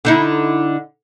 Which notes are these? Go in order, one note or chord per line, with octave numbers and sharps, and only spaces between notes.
D3 D#4 E4